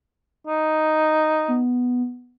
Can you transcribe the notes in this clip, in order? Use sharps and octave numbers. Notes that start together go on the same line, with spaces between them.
D#4
B3